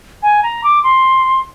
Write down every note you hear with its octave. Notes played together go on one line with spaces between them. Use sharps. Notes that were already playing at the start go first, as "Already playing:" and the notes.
G#5
A#5
D6
C6